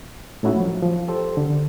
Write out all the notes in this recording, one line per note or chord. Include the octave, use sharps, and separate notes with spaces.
A2 A3 C#4 D#4 E4 F#4
F3 F#3
F3
G4 A4 C5
D3